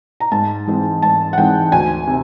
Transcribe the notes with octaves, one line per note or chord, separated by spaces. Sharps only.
A#5
G#2 A5
E3 G#3 C4 D#4
G#2 A5
F#5
E3 G#3 C4 D#4 G5
D2 G#5
C3